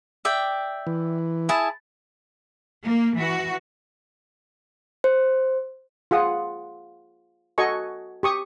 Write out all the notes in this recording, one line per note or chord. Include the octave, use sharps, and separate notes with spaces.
D5 E5 G5
E3
E4 G#4 A5
A#3
E3 F#4
C5
F4 G#4 F#5 D#6
F#4 A4 D#5 G#5 C#6
G4 C#6 D#6